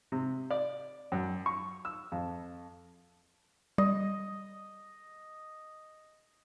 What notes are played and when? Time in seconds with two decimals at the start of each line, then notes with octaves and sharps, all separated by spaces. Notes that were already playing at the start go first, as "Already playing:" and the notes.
0.12 C3
0.51 D5
1.12 F#2
1.46 C#6
1.85 E6
2.12 F2
3.78 G3 D#5